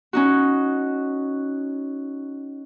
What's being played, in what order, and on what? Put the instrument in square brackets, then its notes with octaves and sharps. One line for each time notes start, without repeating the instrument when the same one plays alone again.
[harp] C#4 D#4 F#4